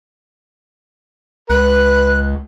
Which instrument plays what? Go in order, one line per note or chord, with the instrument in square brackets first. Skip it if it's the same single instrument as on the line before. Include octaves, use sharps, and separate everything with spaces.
[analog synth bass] C#2 [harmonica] B4 [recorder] F#6